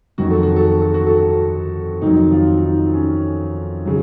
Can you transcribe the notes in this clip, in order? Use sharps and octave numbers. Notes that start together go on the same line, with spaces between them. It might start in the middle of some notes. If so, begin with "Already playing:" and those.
F2 D#3 F#3 F#4
A4
F#4
A4
F#4
A4
F#4
A4
F#4
F2 D#3 F#3 D#4
F4
D#4
C#4
C#3 F#3